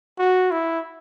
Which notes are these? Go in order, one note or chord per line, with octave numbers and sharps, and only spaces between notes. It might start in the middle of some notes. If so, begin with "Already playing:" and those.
F#4
E4